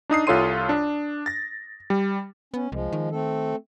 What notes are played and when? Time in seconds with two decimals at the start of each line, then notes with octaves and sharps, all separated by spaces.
0.10 D4 D#4 D#6 C7
0.27 C2 F4 A4 C#5 C6 D#7
0.69 D4
1.26 A6 A#6
1.90 G3
2.54 B3 C#4
2.72 C2 F3 G#3
2.92 D#3
3.11 A3 C4 A4